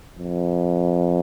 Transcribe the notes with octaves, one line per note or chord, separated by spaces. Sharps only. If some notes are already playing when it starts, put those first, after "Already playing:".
F2